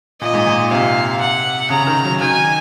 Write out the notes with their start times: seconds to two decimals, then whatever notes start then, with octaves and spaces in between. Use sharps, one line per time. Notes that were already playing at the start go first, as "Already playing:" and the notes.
0.21 A#2 D#5
0.34 G#2
0.47 A#2
0.71 C3 F5
1.21 F#5
1.70 C#3 A#5
1.87 D#3
2.05 F#3
2.21 D#3 G#5